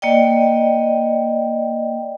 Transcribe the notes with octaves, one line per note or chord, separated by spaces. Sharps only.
A#3 D5 D#5 G5